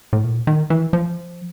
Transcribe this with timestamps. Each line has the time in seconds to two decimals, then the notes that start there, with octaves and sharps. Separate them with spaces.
0.13 A2
0.24 A#2
0.47 D#3
0.70 E3
0.93 F3